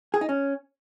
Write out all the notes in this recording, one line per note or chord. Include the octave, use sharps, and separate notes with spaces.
G#4
D#4
C#4